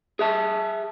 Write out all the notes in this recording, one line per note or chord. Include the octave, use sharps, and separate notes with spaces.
G#4 E5 A5